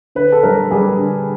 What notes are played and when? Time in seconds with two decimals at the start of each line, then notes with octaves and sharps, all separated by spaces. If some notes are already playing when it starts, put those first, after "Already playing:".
0.15 D3 B4
0.32 A4
0.43 G3 A#4
0.71 G3 G#4
0.99 D3